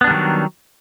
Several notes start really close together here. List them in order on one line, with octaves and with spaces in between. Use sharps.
B3 D4 G3 D#3 F#3